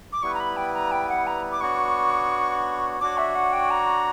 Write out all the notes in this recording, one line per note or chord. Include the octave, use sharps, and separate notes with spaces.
D6
G3 B3 E4 B4 C#6
A#5
B5
G5
A#5
G5
F#5
A#5
D6
B3 D4 F#4 C#5 C#6
D4 F#4 C#5 D6
E5
F#5
G5
A#5